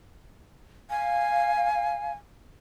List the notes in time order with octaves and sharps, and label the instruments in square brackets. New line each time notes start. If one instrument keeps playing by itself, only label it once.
[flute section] F5 [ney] G#5